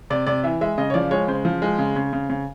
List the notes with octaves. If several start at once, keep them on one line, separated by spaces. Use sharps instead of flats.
C3 D5
C3 D5
E3 E5
G#3 E5
C#3 D#5
C#5
F3 D5
G#3 C#5
C#3 C5
F3
G#3
C#3
C#3
C#3
C#3